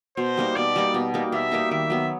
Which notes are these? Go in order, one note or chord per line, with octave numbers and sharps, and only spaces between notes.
B2 C5
G3 A#3 D#4
B2 D5
G3 A#3 D#4
B2
G3 A#3 D#4
B2 E5
G3 A#3 D#4
D#3 E5
F#3 B3